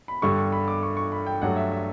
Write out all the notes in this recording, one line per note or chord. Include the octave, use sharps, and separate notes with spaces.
B5
G2 D3 G3 C#6
C#6
B5
D6
C#6
C#6
B5
G5
G2 F#3 A3 F#5
E5
E5